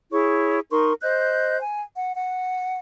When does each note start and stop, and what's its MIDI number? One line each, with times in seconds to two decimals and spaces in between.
0.11 0.61 64
0.11 0.61 68
0.11 0.61 73
0.11 0.61 85
0.70 0.93 63
0.70 0.93 70
0.70 0.93 84
0.70 0.93 85
1.02 1.59 72
1.02 1.59 75
1.02 1.59 90
1.02 1.59 91
1.60 1.82 80
1.95 2.15 78
2.15 2.79 78